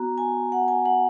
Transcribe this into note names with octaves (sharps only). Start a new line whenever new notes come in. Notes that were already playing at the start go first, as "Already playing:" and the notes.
Already playing: B3 F#4 A#5
G#5
F#5
G#5
F#5